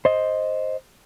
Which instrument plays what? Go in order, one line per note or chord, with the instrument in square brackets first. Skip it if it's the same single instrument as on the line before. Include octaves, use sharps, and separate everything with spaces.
[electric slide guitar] C5 D#5